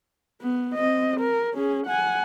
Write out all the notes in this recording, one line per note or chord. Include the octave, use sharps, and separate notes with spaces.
B3
C4 D#5
A#4
C#4 G#4
F#5 G#5